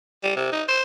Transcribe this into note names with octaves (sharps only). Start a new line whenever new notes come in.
G3
C3
D#4
C5